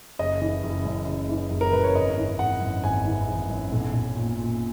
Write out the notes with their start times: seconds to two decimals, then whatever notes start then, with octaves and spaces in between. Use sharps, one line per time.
0.19 F#1 D#5
0.42 E3
0.63 F#1
0.85 F#2
1.07 F#1
1.29 E3
1.51 F#1
1.61 A#4
1.72 F#2 B4
1.84 C#5
1.95 G#1 D#5
2.18 E3
2.39 G#1 F#5
2.61 F#2
2.84 G#1 G#5
3.05 E3
3.28 G#1
3.50 F#2
3.72 B1
3.93 B1
4.16 A#2
4.38 A#2